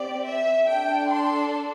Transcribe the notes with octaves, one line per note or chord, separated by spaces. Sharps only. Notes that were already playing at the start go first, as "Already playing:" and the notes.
Already playing: C4 G4 D5
E5
D4 A4 G5
C6